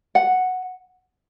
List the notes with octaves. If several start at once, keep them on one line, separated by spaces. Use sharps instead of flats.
F#5